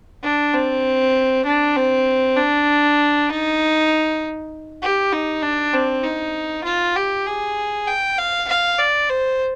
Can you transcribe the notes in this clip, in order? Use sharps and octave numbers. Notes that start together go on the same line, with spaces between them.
D4
C4
D4
C4
D4
D#4
G4
D#4
D4
C4
D#4
F4
G4
G#4
G5
F5
F5
D5
C5